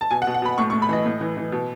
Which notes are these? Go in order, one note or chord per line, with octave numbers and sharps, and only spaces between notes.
A5
B2 G#5
F#5
B2
F#5
B2 B5
A2 C#6
C#6
A2
B5
E3 D#5
A2
E3
E3
B2